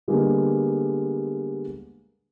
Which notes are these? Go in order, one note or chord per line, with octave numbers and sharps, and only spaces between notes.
D3 G3 G#3 A#3 B3